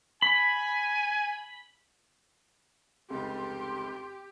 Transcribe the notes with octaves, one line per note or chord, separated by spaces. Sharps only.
G#5 B5
F1 C#2 G4 C6